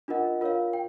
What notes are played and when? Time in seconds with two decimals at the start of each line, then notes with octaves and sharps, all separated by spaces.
0.08 D4 F4 A#4 D#5 F#5
0.41 F4 A#4 C#5 F5
0.73 G5